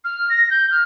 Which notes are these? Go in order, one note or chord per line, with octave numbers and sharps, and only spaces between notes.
F6
A#6
G6
F6